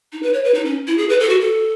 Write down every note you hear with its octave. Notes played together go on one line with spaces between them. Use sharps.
D#4
B4
C#5
B4
D#4
C#4
E4
G#4
B4
A4
F#4
A4